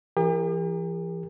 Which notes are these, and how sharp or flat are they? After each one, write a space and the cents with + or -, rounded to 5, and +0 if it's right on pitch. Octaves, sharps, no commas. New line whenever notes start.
E3 +40 G4 +45 A#4 +0